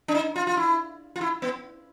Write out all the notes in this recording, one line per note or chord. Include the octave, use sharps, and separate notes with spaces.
D4
D#4
F4
F4
E4
F4
E4
B3